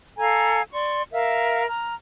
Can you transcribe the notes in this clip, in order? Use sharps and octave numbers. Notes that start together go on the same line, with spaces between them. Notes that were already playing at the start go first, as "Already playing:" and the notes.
A4 F5 G#5 A#5
D5 C6 C#6
A#4 E5 F5
A#5 F6